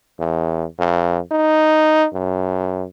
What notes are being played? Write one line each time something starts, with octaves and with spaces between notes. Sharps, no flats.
E2
F2
D#4
F#2